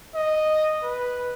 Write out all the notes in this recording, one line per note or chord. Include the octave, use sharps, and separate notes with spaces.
D#5
B4